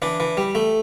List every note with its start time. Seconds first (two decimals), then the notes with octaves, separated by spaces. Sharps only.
0.02 E3 D4
0.20 E3
0.37 G3
0.55 A3